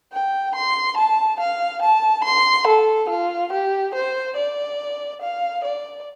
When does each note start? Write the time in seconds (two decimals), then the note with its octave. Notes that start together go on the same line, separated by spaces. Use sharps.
0.13 G5
0.55 C6
0.97 A5
1.40 F5
1.82 A5
2.24 C6
2.67 A4
3.09 F4
3.52 G4
3.94 C5
4.37 D5
5.22 F5
5.64 D5